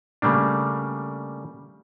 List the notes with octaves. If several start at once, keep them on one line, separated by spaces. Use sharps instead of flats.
C#3 G3 A3 A#3 D4